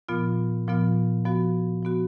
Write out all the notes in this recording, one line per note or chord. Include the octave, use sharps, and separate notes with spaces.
A#2 F3 B3 F4
A#2 F3 B3 F4
F3 B3 F#4
F3 B3 F#4